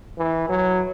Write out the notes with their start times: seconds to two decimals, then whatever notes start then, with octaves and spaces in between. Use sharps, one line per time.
0.19 E3
0.49 F#3